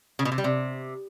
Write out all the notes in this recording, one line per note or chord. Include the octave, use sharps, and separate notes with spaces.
C#3
B2
C3
G3
C3